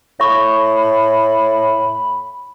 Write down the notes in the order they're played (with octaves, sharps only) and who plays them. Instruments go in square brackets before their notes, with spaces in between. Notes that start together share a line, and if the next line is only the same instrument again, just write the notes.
[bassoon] A2 [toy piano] E5 C#6 [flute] B5